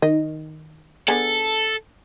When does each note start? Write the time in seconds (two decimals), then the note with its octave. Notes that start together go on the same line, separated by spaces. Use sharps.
0.02 D#3 D#5
1.08 D3 B3 G#4 A4